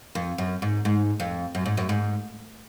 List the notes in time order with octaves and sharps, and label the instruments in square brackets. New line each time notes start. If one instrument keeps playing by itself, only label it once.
[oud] F2
F#2
G#2
G#2
F2
F#2
G#2
F#2
G#2